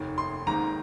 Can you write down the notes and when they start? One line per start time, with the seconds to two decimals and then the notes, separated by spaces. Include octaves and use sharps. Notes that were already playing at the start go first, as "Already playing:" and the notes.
Already playing: F1 D#2 D#3
0.18 C6
0.46 G#1 G#2 D#3 A#3 A#5